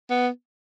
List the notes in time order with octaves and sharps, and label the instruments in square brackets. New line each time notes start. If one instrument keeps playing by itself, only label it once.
[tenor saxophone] B3